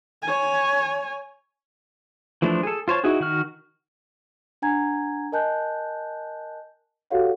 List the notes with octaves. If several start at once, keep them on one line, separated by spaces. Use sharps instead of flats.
C#5 G#5
E3 F3 A3 D4
G#4 A4
F4 C5 C#5 A5
D#4 E4 F#4 G#4
D#3 F#4 F6
D4 F#5 G#5 A#5 G#6
A#4 D#5 G#5 A5 F#6 G6
F#4 G4 A4 C#5 F5 F#5